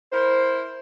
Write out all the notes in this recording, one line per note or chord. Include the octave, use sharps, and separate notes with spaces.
E4 A#4 C5